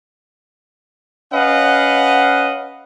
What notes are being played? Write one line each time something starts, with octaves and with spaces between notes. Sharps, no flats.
C#4 B4 D#5 F5 F#5